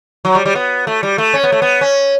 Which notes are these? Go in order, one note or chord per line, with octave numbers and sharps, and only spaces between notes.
F#3
G3
G3
B3
A3
G3
A3
C#4
B3
A3
B3
C#4